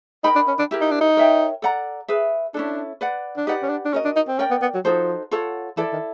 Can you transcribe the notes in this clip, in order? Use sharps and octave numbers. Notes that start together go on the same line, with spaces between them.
D#4 A#4 D#5 G5 B5
D4
C#4
D4
E4 G4 A#4
D#4
D4
D#4
A#4 C#5 E5 G5
A4 D5 F#5 A#5
G#4 B4 E5
C#4 D4 E4 A4
B4 D5 F#5
D4
D#4 G4 B4 D5 F#5
C#4
D4
D4
C#4 F#4 A#4 D#5
D4
D#4
C4
C#4 A#4 D5 G5
B3
B3
F#3
F3 D#4 F#4 A4 C5
F4 A4 C#5 F#5
E3 E4 A4 D5
D#3